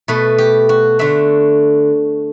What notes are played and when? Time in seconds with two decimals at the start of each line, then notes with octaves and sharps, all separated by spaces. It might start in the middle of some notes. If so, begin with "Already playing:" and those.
0.08 B2 A3 B4
0.38 G4
0.69 F#4
0.99 D3 A3 E5